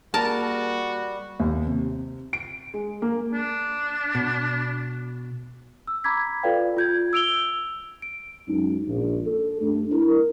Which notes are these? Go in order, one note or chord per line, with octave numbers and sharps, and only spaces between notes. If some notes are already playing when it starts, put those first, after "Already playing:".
G3 A#3 F#4 G#4 A#4 A5
D#2
C3
D7
G#3
A#3
D4
B2
E6
A#5 B5 D6 G#6 B6
F4 A4 B4 D5 F5 G5
F4 G6 G#6
E6 D7 F7 G7
D7
F#2 F#3 G#3 C#4 D#4
A#1
A4
G2 A3 D4
E4 A#4